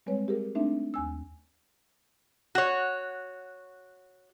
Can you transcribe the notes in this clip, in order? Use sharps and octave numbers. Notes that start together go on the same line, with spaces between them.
G3 G#3 C4 B4 C#5
G4 G#4 A#4
A3 C4 D4 D#4 E5
D#2 G#5 E6
F#4 C#5